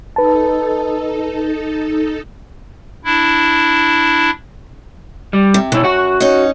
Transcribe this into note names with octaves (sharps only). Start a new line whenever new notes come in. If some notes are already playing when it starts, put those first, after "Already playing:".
D#4 A4 B4 A5
D4 E4
G3
C3
F#2 B2 E4
F#4 F#5
C#4 D#4